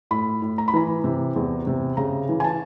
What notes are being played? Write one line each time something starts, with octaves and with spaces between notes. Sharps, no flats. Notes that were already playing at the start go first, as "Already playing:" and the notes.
A2 B5
A2
A#5
B5
E3 A#5
C3
E2
C3
C#3 A#5
E3
G#5
A5